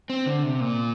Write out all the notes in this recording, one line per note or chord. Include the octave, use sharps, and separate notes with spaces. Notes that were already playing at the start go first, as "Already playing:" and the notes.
C4
D3
C3
A#2